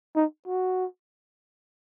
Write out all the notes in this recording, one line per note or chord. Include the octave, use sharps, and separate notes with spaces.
D#4
F#4